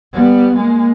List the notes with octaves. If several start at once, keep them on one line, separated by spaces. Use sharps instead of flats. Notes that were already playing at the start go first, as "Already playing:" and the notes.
G3 B3
G#3 A#3